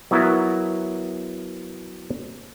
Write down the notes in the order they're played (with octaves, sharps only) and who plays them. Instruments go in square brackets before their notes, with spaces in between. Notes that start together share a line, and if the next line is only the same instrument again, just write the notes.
[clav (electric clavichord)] F#3 B3 E4 F#4 A#4 E5